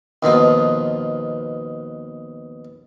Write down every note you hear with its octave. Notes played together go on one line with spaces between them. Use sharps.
D#2 B2 F3 D#4